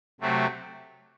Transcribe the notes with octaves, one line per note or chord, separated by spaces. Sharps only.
C3 F#3 A3 C4